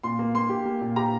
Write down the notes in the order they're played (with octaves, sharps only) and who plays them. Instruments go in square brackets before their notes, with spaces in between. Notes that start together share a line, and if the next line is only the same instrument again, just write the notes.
[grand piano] A#2 [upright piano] C6
[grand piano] A#3
[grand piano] A#3 [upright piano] C6
[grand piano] G4
A#3
A#2
[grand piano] G4 [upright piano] A#5